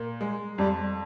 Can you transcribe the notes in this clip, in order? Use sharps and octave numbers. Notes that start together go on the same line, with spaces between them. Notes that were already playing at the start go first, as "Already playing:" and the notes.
Already playing: A#2
G#3
F2 G3